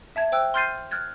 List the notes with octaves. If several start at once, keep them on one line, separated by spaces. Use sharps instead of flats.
E5 A5 G#6
C5 G5 E6 F#6
C6 F6 G6 A6 C7 D#7
F6 F#6 G#6 A6